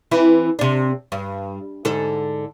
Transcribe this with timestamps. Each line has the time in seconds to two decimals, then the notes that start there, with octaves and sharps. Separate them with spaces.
0.11 E3 C4 E4
0.59 C3 D4
1.12 G2
1.85 G#2 D3 A4